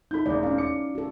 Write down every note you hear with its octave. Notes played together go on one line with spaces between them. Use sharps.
D#4 E4 A4 B5 G6
E1 A1 D5
C#4 F5
D6 C#7
F#4 A4